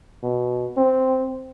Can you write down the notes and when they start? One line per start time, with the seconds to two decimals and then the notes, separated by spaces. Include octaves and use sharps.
0.23 B2
0.77 C4